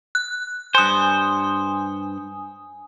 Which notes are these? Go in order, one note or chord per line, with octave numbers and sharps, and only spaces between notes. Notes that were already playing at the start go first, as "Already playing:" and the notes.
F#6
G2 C5 G#5 D#6